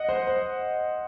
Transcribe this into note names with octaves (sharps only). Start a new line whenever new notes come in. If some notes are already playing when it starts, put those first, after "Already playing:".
Already playing: D#5 F#5
C5
C5